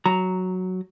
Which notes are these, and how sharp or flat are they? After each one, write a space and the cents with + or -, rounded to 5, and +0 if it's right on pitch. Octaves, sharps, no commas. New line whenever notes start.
F#3 +0 A#5 -5